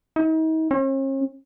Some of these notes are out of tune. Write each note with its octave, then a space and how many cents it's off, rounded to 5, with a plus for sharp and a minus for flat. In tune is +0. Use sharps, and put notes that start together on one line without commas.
D#4 +40
C#4 -45